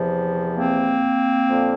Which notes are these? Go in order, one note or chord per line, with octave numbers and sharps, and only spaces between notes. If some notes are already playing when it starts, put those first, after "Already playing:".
Already playing: E2 C3 F3
A#3 C4
F2 D3 F3